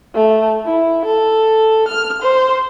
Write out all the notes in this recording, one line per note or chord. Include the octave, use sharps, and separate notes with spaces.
A3
E4
A4
F6
C5